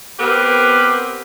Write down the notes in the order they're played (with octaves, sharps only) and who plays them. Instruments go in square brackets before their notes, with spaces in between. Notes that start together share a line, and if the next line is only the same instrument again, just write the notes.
[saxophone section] B3 C4 G4 A#4 B4